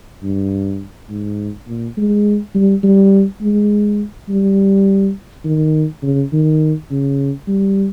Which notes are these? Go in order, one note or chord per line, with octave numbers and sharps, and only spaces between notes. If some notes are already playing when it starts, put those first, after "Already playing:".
G2
G#2
A#2
G#3
G3
G3
G#3
G3
D#3
C#3
D#3
C#3
G3